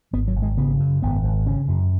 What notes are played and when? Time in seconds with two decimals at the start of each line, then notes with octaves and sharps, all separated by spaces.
0.13 G#1 B3
0.28 F#3
0.36 G#1
0.42 G#3
0.58 C#3 B3
0.80 F#2
1.02 G#1 B3
1.24 G#1
1.46 C#3 C#4
1.68 F#2